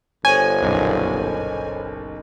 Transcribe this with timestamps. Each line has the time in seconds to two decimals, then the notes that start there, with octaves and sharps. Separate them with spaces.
0.25 G1 A4 C5 C#5 G#5 C#6
0.61 F#1 B1 A#2